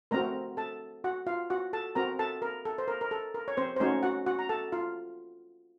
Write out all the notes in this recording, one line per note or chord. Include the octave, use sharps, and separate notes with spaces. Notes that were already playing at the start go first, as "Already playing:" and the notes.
A3 C4 F#4 A#4 A#5
A4 A5
F#4 F#5
F4 F5
F#4 F#5
A4 A5
C4 F#4 A#4 A#5
A4 A5
A#4
A4
C5
A#4
A#4
A4
A#4
C#5
C4 C5
C5
A3 C#4 D#4 F#4 C#5
F#4 F#5
F#4 F#5
A#5
A4 A5
F4 F5